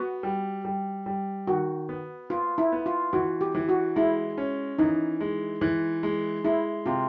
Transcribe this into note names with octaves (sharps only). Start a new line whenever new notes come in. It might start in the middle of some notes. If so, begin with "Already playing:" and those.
Already playing: B3 F#4
G3
G3
G3
D#3 F#4
B3
B3 F4
E4
B3
F4
E3 F#4
G4
E3
F#4
G#3 E4
C#4
E3 D#4
G#3
E3
G#3
G#3 E4
C3 F4